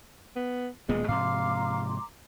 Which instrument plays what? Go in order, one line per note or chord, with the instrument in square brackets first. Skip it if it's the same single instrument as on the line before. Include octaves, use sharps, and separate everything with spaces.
[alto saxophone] B3
[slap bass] D#1 A#2 B3 [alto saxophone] G#3
[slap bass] G#2 C3 F3 [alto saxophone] F5 [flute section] A#5 C6 D6